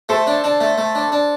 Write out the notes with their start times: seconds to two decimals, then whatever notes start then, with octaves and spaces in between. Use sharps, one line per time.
0.09 A3 A4 C5
0.27 D4
0.44 D4
0.61 A3
0.78 A3
0.95 D4
1.12 D4